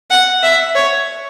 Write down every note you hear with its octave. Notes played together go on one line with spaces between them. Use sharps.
F#5
E5
C#5